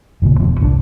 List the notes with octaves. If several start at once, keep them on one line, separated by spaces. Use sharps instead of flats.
G1 D#2 A#2 C#3
E1 B2 F3
G1 C2 A#2 D4